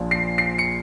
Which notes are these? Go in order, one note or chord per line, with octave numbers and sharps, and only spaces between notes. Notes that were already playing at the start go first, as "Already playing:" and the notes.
Already playing: A#1 A#2 F3
C7
C7
C#7